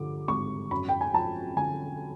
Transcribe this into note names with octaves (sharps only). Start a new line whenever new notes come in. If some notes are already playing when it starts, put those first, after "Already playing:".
Already playing: G2 D3 F3 D6
G#1 C#6
F#2 B5
G5
G#5
F3 A5
D3 G#5